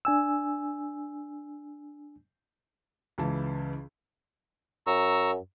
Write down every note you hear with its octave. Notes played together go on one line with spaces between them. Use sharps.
D4 G#5 E6
C#2 C#3 E3 A5
F#2 A#5 C#6 E6